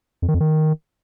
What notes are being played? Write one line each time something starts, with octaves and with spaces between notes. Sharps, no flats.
F2
D#3
F2
D#3